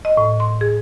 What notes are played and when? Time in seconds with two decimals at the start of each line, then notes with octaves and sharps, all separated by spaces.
0.05 D#5
0.17 A2
0.40 C6
0.61 G#4